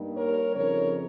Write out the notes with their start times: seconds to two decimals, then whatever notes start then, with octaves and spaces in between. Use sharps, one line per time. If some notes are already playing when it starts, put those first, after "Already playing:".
Already playing: G2 G3 A#3 D#4
0.16 A#4 C#5
0.55 F2 C#3 F3 C4 D#4 A#4 C#5